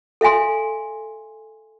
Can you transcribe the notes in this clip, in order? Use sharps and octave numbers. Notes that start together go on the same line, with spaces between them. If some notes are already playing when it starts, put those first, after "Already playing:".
A4 E5 F5 G#5 C6